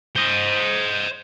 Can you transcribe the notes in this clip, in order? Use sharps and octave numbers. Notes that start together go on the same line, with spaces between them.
C5 D#5